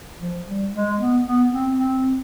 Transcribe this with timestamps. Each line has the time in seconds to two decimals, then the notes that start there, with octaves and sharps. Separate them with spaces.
0.20 F3
0.47 G3
0.73 G#3
0.99 B3
1.25 B3
1.51 C4
1.78 C4